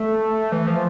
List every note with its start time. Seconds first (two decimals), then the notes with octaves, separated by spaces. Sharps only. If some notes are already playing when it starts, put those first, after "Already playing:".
Already playing: A3
0.52 E3
0.67 F3